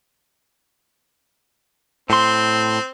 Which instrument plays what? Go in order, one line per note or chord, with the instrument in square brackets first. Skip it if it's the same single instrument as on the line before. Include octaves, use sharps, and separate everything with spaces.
[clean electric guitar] A2 C6 [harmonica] C4